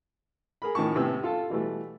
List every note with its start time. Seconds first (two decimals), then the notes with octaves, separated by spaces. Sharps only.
0.62 G#4 A#4 B5
0.75 A2 D#3 F3 C#4 A5 C#6
0.95 A2 C3 B3 C#4 G5 E6
1.23 F4 A4 A5
1.50 B2 E3 G3 A3